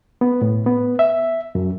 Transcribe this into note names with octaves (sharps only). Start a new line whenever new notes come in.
B3
A2
B3
E5
F#2